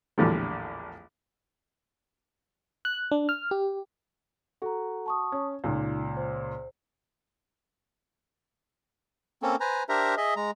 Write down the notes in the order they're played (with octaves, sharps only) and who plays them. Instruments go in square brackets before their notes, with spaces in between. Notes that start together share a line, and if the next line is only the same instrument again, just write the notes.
[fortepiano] A#1 E2 A2 D3 G3
[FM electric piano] F#6
D4
F6
G4
[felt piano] F#4 [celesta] A4 A#5
[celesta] A5 C#6 D#6
[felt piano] C#4
[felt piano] C#2 A#2 [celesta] D#4
[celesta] C5
[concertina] A#3 C4 C#4 A4
B4 C5 G#5 A#5
D4 G4 A#4 C5 E5 A#5
G#4 D#5 E5
G#3 A#5